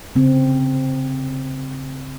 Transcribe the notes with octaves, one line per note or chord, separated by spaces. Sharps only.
C#3 C4